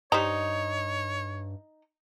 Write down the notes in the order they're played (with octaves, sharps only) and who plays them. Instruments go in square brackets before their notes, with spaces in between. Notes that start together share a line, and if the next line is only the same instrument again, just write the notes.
[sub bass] G2 [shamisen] G3 C5 A#5 [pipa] D#4 [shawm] C#5